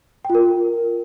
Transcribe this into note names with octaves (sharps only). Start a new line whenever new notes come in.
G5
F4
A#4